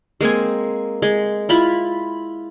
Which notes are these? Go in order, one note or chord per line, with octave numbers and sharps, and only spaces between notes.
G#3 A#3 C4 G#5
G#3
E4 F4 B5